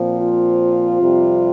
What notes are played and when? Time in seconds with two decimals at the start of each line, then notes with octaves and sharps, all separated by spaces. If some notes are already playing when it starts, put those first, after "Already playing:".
Already playing: A#2 F3 C4
0.19 F4
1.00 F2 C3 G3